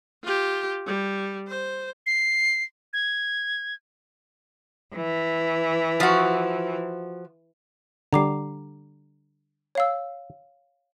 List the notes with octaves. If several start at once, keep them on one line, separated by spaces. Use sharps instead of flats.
F4 G4
G3
C5
C7
G#6
E3
F3 F#4
D3 G3 A#5 D6 C7
C#5 F5 E6